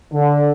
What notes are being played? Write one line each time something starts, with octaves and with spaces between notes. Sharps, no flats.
D3